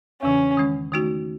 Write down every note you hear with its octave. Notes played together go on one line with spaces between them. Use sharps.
E2 C#3 E3 C#4
D#3 G#3 C#4
D#3 A3 D#4 F#4